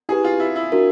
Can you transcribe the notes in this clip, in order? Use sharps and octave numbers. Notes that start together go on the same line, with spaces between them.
E4 G4 G#4 B4
F4
E4
E4
D4 F#4 A#4